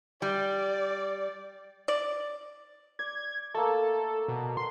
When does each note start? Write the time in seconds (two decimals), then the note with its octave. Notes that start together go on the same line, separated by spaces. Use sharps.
0.22 G3 D5
1.88 D5
2.99 D5 G#6
3.54 A3 A#3 A4
4.28 B2
4.57 C6